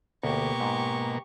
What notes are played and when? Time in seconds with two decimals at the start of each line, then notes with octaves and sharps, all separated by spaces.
0.23 D2 B2 A#3 G4 C#6
0.60 G#2